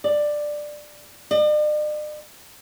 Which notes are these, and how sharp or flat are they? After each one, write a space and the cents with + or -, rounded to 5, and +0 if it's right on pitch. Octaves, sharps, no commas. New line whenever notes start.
D5 +10
D5 +45